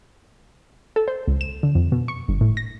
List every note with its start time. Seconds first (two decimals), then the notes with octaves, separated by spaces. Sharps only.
0.96 A4
1.08 C5
1.27 C#2
1.41 E7
1.63 D3
1.75 F2
1.92 B2
2.08 C#6
2.28 G1
2.41 A2
2.57 A#6